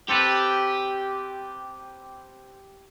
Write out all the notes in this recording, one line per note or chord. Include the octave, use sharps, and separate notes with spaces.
C4 G4 A4 B4